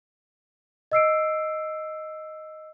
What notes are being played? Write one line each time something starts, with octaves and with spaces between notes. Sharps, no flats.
D#5 E6 C7 D7